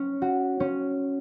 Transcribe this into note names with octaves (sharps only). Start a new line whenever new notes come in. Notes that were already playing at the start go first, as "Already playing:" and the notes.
Already playing: C#4
F#4
C#4